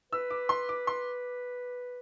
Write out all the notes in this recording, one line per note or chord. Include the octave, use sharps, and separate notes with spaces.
B4 E6
D6
C6
D6
C6